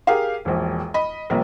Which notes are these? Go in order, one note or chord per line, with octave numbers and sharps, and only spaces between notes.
G4 G#4 A#4 F5
E1 A#1
D#5 B5
A#1 C3 G3 A#3